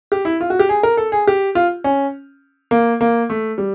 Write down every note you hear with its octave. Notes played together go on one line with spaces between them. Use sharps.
G4
E4
F4
F#4
G4
G#4
A#4
A4
G#4
G4
F4
C#4
A#3
A#3
A3
G3